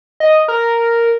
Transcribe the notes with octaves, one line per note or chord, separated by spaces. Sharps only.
D#5
A#4